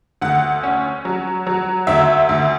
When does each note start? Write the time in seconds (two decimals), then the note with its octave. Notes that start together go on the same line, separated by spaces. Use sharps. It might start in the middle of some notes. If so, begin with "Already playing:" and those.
0.21 D2 F#5
0.63 C#4
1.05 F#3
1.47 F#3
1.87 D2 E5
2.29 D2